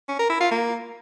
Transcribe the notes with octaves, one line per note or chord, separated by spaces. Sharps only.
C#4
A#4
E4
F4
A#3